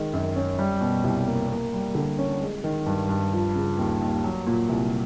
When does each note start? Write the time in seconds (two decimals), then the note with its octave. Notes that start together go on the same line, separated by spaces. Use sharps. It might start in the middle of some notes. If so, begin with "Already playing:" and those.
Already playing: D#3 G#3
0.13 F#2
0.36 C#4
0.59 G3
0.81 B2
1.04 C2
1.27 A#3
1.49 A#3
1.73 G3
1.95 D3
2.19 C#4
2.42 G#3
2.64 D#3
2.86 G2
3.09 G2
3.33 F3
3.55 C#3
3.78 D#2
4.01 D#2
4.24 F#3
4.47 A#2
4.69 C2